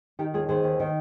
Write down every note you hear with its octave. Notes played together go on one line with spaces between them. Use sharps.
D#3 D#4 G4
D#2 F4 G#4
D#3 G#4 C5
D#2
D#3